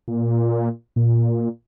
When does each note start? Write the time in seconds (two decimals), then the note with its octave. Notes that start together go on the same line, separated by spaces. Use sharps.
0.08 A#2
0.96 A#2